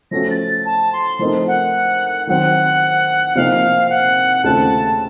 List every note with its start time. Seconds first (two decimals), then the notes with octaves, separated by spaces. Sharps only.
0.11 F3 A3 C#4 F#4 A#6
0.30 A6
0.65 A5
0.92 C6
1.19 F3 A3 C4 D#4 A#4
1.47 F#5
2.27 D#3 F#3 C4 F#5
3.35 C3 F3 A#3 D#4 F5
3.89 F#5
4.44 D#2 C#3 A3 C4 F4 A5